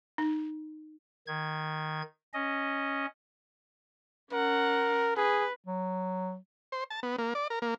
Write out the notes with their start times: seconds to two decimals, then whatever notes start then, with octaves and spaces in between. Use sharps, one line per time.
0.18 D#4
1.27 D#3 G#6
2.33 C#4 D#5
4.33 C#4 A#4 F#5
5.16 G#4 B4
5.66 F#3
6.72 C5
6.90 A5
7.03 B3
7.18 A#3
7.35 D5
7.50 A#4
7.62 A#3